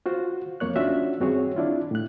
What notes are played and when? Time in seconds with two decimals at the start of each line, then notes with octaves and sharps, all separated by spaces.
0.06 F4 F#4 C5
0.60 F2 A#3 C#5 F#6
0.76 C#4 D4 F4 F#4 E5
1.20 G2 C4 F#4 G#4 C#5
1.56 D4 E4 F4
1.91 A2 F#6